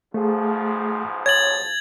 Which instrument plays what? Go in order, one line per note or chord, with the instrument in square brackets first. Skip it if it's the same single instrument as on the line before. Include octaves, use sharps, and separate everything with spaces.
[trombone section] B1 G#2 F3 [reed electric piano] A3 G#4
[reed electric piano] C#5 [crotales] G#6 A6 F#7